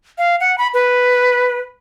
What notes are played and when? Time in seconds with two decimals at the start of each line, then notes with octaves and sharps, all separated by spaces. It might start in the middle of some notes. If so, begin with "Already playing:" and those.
0.18 F5
0.40 F#5
0.58 B5
0.74 B4